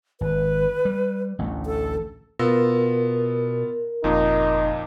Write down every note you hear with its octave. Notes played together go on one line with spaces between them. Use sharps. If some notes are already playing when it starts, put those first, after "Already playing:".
G#1 B4
G3
A1 D2 A3
A4
B2 B3 F4 A#4 E6
F#1 F2 A#2 D#4